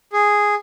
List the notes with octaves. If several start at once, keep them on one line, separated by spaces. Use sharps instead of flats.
G#4